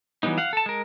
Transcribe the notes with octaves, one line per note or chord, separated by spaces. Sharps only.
E3 F#3 G3 B3 D#4
F5 F#5
A4 A5
G#3 A#4